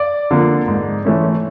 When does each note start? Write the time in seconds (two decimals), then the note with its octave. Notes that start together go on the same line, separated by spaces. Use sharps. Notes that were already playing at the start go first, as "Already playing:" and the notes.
Already playing: D5 D6
0.31 D3 F3 A#3
0.68 G#2
1.05 E3 A3 C#4